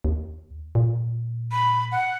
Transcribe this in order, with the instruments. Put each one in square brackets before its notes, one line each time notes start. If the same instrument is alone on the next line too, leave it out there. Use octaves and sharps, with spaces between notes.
[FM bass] D#2
A#2
[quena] B5
F#5